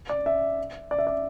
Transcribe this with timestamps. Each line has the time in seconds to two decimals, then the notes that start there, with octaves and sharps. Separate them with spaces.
0.09 D5
0.26 E5
0.91 D5
0.99 E5
1.07 D5